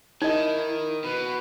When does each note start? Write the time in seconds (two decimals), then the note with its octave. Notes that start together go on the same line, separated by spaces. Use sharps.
0.22 D#3 D#4 E4 D#5
1.04 B2 B4